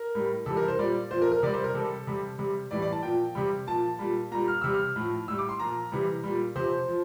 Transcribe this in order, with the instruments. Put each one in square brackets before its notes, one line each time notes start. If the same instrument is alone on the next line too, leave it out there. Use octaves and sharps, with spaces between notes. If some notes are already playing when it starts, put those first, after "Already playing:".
Already playing: [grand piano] A#4
A2 G3
C3 E3 G3 A4
A#4
C5
A#2 G3 D5
A#2 F3 C5
A#4
A#4
C3 D5
G3
C5
A#4
C3 G3 A4
C3 G3
C3 G3
A2 E3 G3 D5
D5
A5
A#2 F3 G5
C3 G3
A#2 F3 A5
A#2 G3
A#2 G3 A#5
F6
C3 G3 E6
F6
A2 F3
A2 G3 E6
D6
C6
A#2 F3 A#5
C3 E3 G3
A#2 G3
C3 F3 C5
F3